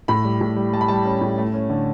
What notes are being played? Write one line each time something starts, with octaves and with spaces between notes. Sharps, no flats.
A2 B5
G3
A2
G3
G3 A5
B5
G3 A5
C#4
A2
A3
C#4
D3